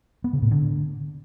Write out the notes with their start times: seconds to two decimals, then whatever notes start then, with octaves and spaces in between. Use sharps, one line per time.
0.24 B3
0.33 C#3
0.42 A2
0.51 D3